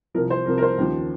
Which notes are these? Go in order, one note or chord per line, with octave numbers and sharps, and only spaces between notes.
C2 C3 F3 A#4
C5
C2 C3 F3 A#4
A#4
C5
D#2 C#3 F3